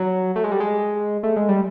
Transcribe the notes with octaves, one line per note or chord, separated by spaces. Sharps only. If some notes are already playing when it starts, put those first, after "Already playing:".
Already playing: F#3
A3
G#3
G3
G#3
A3
G#3
G3